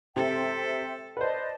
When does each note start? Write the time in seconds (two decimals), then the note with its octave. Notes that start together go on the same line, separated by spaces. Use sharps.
0.16 C3 A4 C5 E5 G5
1.17 B4 C5 D5 D#5 A5